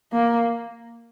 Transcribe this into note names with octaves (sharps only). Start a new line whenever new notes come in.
A#3